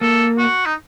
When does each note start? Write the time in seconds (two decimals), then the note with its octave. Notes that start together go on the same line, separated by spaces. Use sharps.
0.01 A#3 A4
0.38 F#4
0.66 D#4